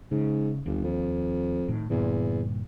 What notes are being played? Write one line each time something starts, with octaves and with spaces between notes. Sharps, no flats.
G#2 C#3
G1 D#2
F2
A2 D#3
E2 G2 A#2 D3